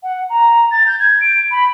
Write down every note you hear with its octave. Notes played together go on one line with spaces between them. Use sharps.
F#5
A#5
A6
G6
G#6
D7
B5